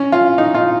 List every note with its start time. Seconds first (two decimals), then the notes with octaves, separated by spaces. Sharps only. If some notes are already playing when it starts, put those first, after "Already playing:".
Already playing: C#4
0.12 F4
0.38 D#4
0.54 F4